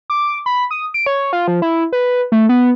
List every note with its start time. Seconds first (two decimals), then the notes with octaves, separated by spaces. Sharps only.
0.10 D6
0.46 B5
0.71 D#6
0.94 D7
1.06 C#5
1.33 F4
1.48 F3
1.62 E4
1.92 B4
2.32 A3
2.49 B3